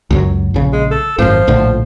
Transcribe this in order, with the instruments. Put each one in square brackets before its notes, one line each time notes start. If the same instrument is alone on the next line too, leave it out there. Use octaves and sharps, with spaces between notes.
[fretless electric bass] C#2 F#2 F#3
A#1 C#3
[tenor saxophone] G#3
A4
[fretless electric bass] G#1 F#2 [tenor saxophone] F3
[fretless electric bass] A#1 A2 D3